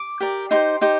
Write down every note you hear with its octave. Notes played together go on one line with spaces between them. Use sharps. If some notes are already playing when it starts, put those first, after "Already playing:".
Already playing: D6
G4 A#4 D5
D#4 G4 C5 C6
D#4 G4 C5